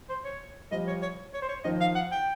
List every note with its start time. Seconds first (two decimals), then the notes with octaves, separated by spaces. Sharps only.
0.09 C5
0.25 C#5
0.71 F3 G3 D#5
0.88 C#5
1.02 C#5
1.34 C#5
1.42 C5
1.49 C#5
1.64 D#3 F3 D#5
1.81 F5
1.95 F#5
2.12 G5